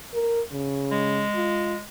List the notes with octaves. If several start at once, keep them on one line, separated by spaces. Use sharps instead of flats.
A#4
C#3
G#3
F4